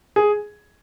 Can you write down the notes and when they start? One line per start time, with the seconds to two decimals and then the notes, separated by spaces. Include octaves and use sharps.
0.16 G#4